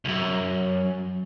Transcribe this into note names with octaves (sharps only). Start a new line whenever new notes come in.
C2 F#2